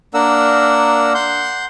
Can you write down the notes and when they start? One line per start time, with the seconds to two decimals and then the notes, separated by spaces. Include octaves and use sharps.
0.14 A#3 D4 A#4 F#5 E6
1.14 F#5 C6 G6